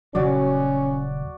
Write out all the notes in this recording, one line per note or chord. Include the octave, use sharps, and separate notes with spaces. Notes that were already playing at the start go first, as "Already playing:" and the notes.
D#1 C#3 F#3 C#4 F#4 D5